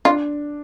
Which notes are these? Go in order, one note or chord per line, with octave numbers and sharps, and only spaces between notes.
D4 F4